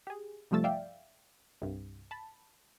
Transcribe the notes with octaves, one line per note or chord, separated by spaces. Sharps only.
G4 G#4
C2 G2 F3 A3 E6 A6
D5 E5 F5 G5
C2 G2
A5 B5